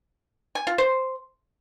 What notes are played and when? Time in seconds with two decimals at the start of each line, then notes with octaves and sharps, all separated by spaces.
0.55 G#5
0.67 F4
0.78 C5